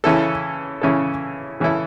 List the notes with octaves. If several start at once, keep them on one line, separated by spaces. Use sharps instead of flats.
C#3 E3 C#4 E4 A4
C#3 E3 C#4 E4 A4
C#3 E3 C#4 E4 A4